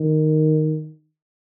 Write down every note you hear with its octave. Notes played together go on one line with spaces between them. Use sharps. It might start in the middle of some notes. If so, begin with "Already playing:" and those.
Already playing: D#3